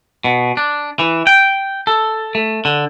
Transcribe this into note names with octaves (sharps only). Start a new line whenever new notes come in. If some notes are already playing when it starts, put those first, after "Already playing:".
B2
D4
E3
G5
A4
A3
D3